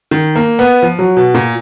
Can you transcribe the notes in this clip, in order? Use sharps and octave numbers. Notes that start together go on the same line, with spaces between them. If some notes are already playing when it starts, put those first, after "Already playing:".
D#3
A#3
B3
F3
F#3
B2
A#2